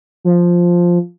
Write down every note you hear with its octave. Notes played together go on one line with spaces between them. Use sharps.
F3